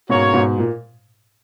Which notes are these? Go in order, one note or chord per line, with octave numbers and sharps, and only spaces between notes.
G#2 B2 A#3 C#4 F#4 C#5
G#2 B2
A#2